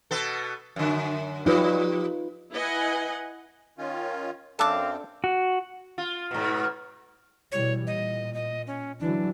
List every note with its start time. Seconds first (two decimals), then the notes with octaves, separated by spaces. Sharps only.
0.11 B2 B3 A4
0.76 F#2 D3
1.46 F3 G3 D#4 F4 B4
2.53 E4 B4 D#5 F#5 G#5
3.78 D#3 C#4 F4
4.59 F#2 C4 D4 A4 F5 A5 D6
5.24 F#4
5.98 F4
6.31 G#2 B2
7.52 B2 E3 G3 C#5
7.87 A#2 D#5
8.34 D#5
8.67 C#4
9.00 D3 E3 F#3 D4